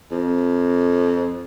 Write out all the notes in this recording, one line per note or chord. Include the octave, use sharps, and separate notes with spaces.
F2